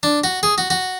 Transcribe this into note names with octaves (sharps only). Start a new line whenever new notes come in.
D4
F#4
G#4
F#4
F#4